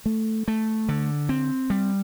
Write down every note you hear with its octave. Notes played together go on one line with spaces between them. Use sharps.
A3
A3
D3
C4
G3